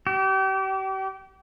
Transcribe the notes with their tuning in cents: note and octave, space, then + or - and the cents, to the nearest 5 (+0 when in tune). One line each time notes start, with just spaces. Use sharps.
G4 -35